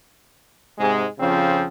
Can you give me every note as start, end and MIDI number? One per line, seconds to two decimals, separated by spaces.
0.79 1.05 44
0.79 1.05 48
0.79 1.05 56
1.19 1.66 41
1.19 1.66 49
1.19 1.66 53
1.19 1.66 60
1.19 1.66 61